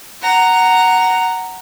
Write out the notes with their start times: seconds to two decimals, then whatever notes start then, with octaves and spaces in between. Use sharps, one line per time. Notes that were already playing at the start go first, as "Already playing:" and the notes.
0.22 F#5 A#5